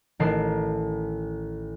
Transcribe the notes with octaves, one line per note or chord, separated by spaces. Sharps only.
A1 D#3 A5 C7